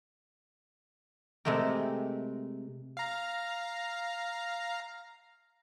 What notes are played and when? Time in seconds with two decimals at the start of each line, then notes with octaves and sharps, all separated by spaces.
1.45 C3 G#3 A3 G4 A#4
2.97 F5 A#5